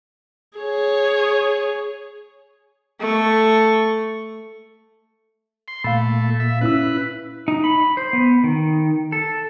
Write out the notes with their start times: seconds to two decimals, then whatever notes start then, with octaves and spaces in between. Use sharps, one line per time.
0.58 G#4 C#5
3.00 A3 C#6
5.68 C6
5.84 A#2 A3 F5 B5
6.40 E5
6.61 C#4 E4 B4 E6
7.48 D#4
7.64 B5
7.97 C5
8.13 B3
8.44 D#3
9.12 A4